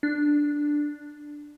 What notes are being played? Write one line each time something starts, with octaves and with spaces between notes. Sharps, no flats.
D4